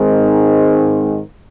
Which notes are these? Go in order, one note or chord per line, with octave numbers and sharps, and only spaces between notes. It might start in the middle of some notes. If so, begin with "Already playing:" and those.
Already playing: G#2 D#3 G#3 C4